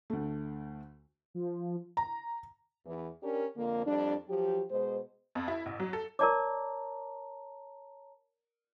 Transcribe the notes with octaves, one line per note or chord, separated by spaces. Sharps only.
D2 A3
F3
A#5
E2 E3
C#4 D4 G4 A#4
F2 D3 F3 A#3
F2 G3 D4
F3 F#3 G4
B2 G#3 C5
F2
E4
A1
F#3
A4
A#4 C#5 D5 A5 A#5 D6